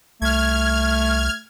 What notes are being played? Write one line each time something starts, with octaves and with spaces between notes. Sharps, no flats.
C2 A3 F6 G#6